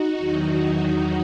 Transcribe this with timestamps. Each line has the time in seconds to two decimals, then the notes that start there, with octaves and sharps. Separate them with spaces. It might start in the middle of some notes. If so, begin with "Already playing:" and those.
Already playing: D#4 F#4
0.18 E2 D#3 F#3